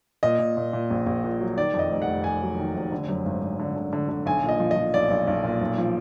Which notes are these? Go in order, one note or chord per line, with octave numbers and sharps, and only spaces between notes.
A#2 D#5
A#2
A#2
A#2
A#1
A#1
A#2
F#3
D#3 D5
F2 D#5
F1
F#5
F1
F1 G#5
F#3
D#3
F1
D3
F#2
G#1
G#1
D3
D3
D3
D3
B1 G#5
A#2
D#5
F3
D#5
F3
B1 D5
B1
B1
A#2
B1
F3